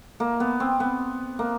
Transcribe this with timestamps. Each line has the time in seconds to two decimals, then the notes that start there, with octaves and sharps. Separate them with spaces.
0.20 A#3
0.40 B3
0.60 C4
0.80 B3
1.39 A#3